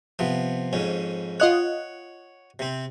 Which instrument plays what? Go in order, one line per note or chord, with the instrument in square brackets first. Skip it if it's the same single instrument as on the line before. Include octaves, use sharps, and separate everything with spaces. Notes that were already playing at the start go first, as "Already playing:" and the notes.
[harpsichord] C3 F3 B3
F2 G#2 C#4
[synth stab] F4 D#5 F#6 [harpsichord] C#5 F#5
[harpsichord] C3 C4